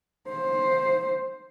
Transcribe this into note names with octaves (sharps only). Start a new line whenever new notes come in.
C5